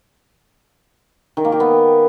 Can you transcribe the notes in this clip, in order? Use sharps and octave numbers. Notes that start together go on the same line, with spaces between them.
D#3
A#3
G4
B3